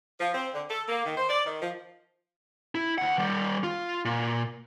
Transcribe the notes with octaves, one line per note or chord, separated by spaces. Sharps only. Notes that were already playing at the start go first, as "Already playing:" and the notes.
F3
C4
D3
A4
A#3
D#3
C5
D5
D#3
F3
E4
D2 F#5
D#3 G3
F4
A#2